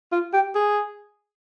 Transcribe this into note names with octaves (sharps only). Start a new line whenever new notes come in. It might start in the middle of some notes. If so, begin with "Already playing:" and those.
F4
G4
G#4